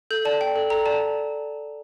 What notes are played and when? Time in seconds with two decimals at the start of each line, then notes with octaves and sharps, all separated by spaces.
0.11 A4 G6
0.25 D5 A5
0.41 G5
0.56 A4
0.70 A4 A#5
0.86 D5 A5